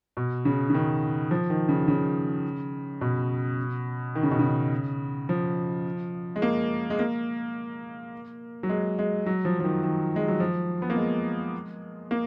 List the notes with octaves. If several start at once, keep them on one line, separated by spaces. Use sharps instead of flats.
B2
C#3
C#3
D#3
F3
D#3
C#3
C#3
B2
D#3
C#3
B2
C#3
F3
G#3
A#3
G#3
A#3
F#3
G#3
G#3
F#3
F3
F3
D#3
D#3
G#3
F#3
F3
B3
A#3
G#3
A#3